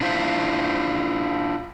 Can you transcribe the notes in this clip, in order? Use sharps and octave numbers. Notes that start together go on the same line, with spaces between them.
D4 E4 F4 C5 E5 F5